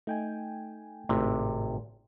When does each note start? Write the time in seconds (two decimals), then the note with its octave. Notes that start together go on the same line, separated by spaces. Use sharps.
0.07 A3 D#4 G5 G#5
1.09 G#1 A2 C3